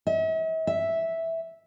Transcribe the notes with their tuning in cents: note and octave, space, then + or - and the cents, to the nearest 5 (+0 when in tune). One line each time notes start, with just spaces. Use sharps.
E5 -45
E5 -5